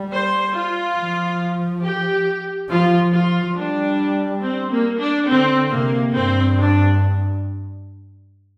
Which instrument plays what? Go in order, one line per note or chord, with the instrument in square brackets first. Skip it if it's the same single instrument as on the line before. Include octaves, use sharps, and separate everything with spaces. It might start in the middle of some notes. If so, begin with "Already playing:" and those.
Already playing: [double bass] G3
[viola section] C5
F4
[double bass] F3
[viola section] G4
[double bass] F3 [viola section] F4
[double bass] F3 [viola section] F4
[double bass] G3 [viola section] D4
[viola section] C4
A#3
D4
[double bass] D3 [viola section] C4
[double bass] C3 [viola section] A#3
[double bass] G2 [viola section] C4
[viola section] D4